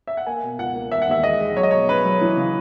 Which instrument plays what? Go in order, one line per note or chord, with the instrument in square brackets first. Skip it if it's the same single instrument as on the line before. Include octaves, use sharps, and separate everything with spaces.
[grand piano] E5
F#5
[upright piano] A#3 [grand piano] G#5
[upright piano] B2
[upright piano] C#2 [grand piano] F#5
[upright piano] A#3
[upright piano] E1 [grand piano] E5
[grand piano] F#5
[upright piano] D#2 [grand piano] E5
[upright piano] G#3 [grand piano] D#5
[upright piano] G#3
[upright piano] F#3 [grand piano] C#5
[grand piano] D#5
[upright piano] B2 [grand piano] C#5
[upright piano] C#4 [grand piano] B4
[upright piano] F#3
E3
C#3